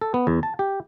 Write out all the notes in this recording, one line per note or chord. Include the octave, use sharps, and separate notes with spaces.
A4
B3
E2
A5
G4